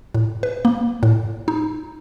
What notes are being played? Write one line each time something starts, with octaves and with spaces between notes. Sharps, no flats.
A2
B4
A#3
A2
D#4